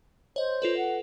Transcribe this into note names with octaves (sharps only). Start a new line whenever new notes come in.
C5 C#5 D#5
F4 A4 B4
F#5